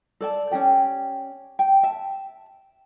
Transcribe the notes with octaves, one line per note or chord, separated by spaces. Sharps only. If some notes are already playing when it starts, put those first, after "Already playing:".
A4 D5 A5
C#4 D#4 G4 G5
G5
E5 A5